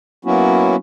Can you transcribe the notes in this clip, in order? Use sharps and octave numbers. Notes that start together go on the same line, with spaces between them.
F#3 A#3 B3 C#4 E4 F#4